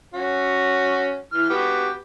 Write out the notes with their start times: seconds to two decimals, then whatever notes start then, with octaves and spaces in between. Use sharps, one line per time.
0.14 C#4 F#4
1.32 E3 F6
1.50 B3 F#4 G4